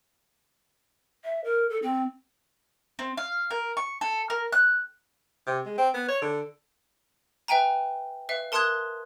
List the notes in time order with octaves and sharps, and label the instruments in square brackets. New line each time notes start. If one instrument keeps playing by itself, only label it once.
[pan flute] E5
A#4
A4
C4
[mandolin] C4
F5
A#4
C#6
A4
A#4
F#6
[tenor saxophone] C3
G#3
C4
B3
C#5
D3
[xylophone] B4 E5 G5 G#5 A#5
B4 E5 F5
A#4 A5 C6 D#6 F#6 G#6